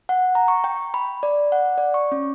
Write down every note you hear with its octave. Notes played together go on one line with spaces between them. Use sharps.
F#5
A#5
C#6
G5
B5
D5
F#5
D5
C#6
C#4